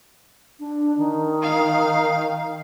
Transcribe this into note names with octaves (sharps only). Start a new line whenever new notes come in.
D4
D#3
F5